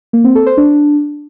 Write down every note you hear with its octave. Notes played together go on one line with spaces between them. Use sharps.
A#3
C4
A4
C5
D4